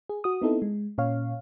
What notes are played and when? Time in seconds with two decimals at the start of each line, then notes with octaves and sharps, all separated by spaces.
0.09 G#4
0.24 F#4 D#6
0.42 B3 C4 D#4 E4 A4
0.62 G#3
0.98 A#2 C#4 C#5 F5